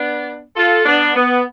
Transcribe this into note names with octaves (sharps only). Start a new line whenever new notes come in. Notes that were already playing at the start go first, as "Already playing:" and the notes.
Already playing: B3 D4
F4 A4
B3 D4
B3